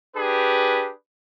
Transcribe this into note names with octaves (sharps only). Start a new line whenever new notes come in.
D4 G4 G#4 B4